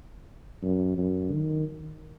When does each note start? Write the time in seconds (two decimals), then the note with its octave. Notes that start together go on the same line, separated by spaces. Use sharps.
0.63 F#2
0.98 F#2
1.33 D#3